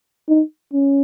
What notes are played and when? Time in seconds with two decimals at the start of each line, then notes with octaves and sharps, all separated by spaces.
0.28 D#4
0.73 C#4